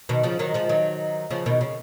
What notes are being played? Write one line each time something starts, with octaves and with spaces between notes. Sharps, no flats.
B2 D#3
C#3 F3
D#3 F#3
F3 G#3
D#3 F#3
C#3 F3
B2 D#3
C#3